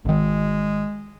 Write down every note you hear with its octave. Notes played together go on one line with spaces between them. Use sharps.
G#1 D#3 G#3